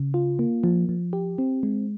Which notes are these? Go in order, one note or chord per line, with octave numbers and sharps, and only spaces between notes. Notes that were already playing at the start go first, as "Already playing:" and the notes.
Already playing: C#3
F4
A#3
F3
F3
G4
C4
G#3